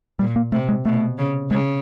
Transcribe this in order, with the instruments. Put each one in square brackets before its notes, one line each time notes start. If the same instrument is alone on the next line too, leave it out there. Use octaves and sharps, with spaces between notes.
[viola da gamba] A#2 [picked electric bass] G3
[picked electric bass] A#3
[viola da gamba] C3 [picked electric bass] A3
[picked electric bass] G#3
[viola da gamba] B2 [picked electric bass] A3
[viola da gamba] C#3
[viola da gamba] C#3 [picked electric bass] G#3